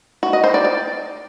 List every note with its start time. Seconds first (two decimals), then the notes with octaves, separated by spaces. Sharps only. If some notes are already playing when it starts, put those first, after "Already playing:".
0.23 F#4
0.33 D#5
0.44 C5
0.54 D5
0.65 D5